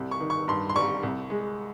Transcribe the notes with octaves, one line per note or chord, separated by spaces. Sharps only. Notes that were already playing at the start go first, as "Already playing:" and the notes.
Already playing: C2 G3
C#6
D#3
C#6
G2 C6
C6
G3 C#6
C2
G#3